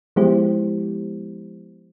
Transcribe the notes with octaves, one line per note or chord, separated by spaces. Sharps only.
F3 G#3 B3 E4 G4 C5